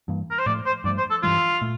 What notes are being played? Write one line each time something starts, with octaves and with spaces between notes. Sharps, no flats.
G2 E3 A#3
A#4
C5
A2 F3 A3 D5
C5
G2 F3 A3 D5
C5
A4
G2 E3 G3 F4
A#2 A3